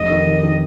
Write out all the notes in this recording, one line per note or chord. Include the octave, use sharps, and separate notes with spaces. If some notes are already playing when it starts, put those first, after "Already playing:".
Already playing: F1 D#5
D#3
D#3
D#3